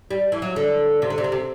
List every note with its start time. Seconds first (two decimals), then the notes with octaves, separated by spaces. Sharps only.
0.11 G3
0.32 E3
0.42 F#3
0.56 D3
1.02 C3
1.10 D3
1.18 C3
1.24 D3
1.32 C3